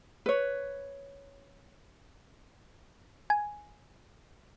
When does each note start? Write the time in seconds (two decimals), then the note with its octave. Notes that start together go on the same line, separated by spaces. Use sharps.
0.26 B4 C#5
3.30 G#5